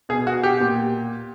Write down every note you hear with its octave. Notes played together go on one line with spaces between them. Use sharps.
B2 G#4
F#4
G4
A#2